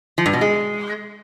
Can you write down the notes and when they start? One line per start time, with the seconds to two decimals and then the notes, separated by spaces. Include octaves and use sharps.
0.18 F3
0.26 G2
0.33 B2
0.41 G#3